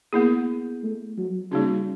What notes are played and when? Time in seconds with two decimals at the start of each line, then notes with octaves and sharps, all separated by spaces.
0.13 A#3 B3 E4 G#4
0.83 A3
1.17 F#3
1.52 C#3 G3 A#3 D#4 F#4